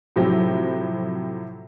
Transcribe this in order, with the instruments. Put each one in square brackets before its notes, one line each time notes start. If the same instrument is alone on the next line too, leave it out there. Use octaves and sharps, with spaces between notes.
[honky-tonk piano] A2 C3 F3 F#3 G4